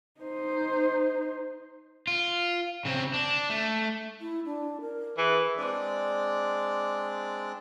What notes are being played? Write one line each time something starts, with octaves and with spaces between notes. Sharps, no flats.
D#4 C5
F4
C#3 C4
D4
A3
E4
D4
A#4
E3 G#4
G#3 C4 D4 D5